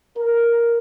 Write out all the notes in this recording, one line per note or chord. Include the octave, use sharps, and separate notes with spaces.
A#4